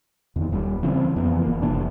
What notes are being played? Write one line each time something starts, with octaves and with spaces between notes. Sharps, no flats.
E2 D#3
D#1 G3
C#3 E3 G#3 C4
F2 E3 A#3 B3
G1 A#3
F#1 C3 E3 D4